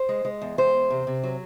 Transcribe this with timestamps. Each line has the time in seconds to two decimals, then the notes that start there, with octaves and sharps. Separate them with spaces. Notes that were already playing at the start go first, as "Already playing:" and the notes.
Already playing: C5
0.09 G#3
0.25 G#3
0.42 E2
0.58 G#3 C5
0.74 E2
0.90 C3
1.07 C3
1.23 F#3